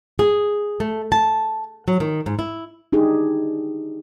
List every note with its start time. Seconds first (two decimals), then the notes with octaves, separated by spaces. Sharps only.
0.19 G#4
0.80 A3
1.12 A5
1.88 F#3
2.00 D#3
2.26 G#2
2.39 E4
2.93 D4 D#4 G4 G#4